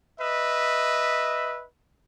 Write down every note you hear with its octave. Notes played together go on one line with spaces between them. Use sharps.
B4 D#5 E5